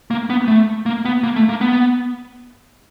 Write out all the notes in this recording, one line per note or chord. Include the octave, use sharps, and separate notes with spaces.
A#3
B3
A3
A#3
B3
A#3
A3
A#3
B3